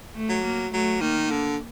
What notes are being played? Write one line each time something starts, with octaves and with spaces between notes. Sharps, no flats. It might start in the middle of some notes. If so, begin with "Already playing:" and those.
A3
F#3
A#3
F#3 A3
D#3 A#3
D3